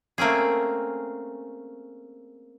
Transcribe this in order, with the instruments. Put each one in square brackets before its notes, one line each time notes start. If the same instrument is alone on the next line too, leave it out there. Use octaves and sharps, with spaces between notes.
[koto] A3 A#3 C4 C#4 G#4